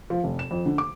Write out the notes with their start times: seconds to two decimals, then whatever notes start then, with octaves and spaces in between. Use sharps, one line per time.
0.10 F3
0.24 F1
0.39 E7
0.51 F2
0.66 D3
0.78 D6